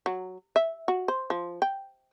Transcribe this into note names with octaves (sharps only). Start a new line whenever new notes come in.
F#3
E5
F#4
C5
F3
G5